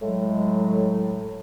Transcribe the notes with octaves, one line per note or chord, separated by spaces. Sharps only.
A2 F#3 G#3